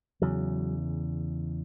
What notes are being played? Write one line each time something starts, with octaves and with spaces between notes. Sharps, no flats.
E2 C#3 F#3